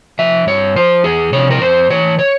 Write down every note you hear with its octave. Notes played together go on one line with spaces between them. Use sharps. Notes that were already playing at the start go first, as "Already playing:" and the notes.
F3 E5
G2 C#5
F3 C5
E2 G#4
C3 F3 C#5
A#4
F2 C5
E3 C#5
C#5